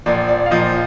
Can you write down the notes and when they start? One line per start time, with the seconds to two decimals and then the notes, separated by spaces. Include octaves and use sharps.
0.06 A#1 A#2 F3 D5
0.28 D5
0.46 F5
0.51 A#1 A#2 F3 D#5